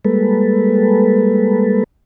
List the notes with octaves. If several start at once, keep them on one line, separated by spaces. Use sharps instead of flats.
G3 G#3 A#3 A4 B4